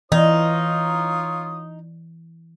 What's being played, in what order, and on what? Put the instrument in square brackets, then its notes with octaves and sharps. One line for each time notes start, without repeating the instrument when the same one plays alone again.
[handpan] E3 [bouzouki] D#4 [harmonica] F4 C#5 D#6 [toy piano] D#5